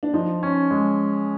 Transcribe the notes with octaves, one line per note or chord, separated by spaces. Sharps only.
D4
F3 D#4
C#4
G#3